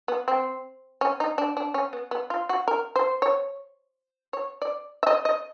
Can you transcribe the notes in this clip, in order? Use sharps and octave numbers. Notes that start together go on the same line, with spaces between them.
B3
C4
C#4
D#4
D4
D4
C#4
B3
B3
F4
F#4
A#4
C5
C#5
C#5
D5
E5
D#5
D#5